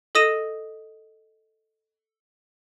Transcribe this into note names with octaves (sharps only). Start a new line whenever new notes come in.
A4 D#5 D#6 A#6 D#7 E7